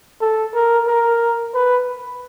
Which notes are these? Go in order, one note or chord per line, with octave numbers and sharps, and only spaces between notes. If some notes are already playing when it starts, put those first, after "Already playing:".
A4
A#4
A#4
B4